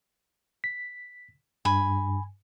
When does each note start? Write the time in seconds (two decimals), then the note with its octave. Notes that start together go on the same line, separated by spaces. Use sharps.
0.64 B6
1.65 G2 G#5 B5